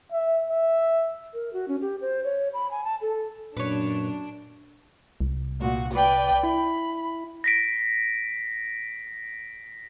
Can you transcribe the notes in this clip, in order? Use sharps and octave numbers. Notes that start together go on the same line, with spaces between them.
E5
E5
A#4
F#4
C#4
G4
C5
C#5
B5
G#5
A5
A4
F#2 A#2 D4 B4 C#5
C2
A#2 F#4
B4 D5 G5
E4 B5
A#6 B6 D7